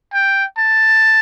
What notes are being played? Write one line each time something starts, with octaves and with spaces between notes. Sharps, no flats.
G5
A5